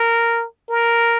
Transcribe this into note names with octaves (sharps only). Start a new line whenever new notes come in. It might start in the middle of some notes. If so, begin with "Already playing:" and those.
Already playing: A#4
A#4